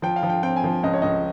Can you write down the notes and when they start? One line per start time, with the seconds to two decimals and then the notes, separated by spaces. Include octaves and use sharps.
0.02 F3 G5
0.16 F5
0.23 F3
0.30 G5
0.43 C4 G5
0.56 G#5
0.64 F3
0.83 C#2 D#5
0.93 C#5
1.02 C#2 D#5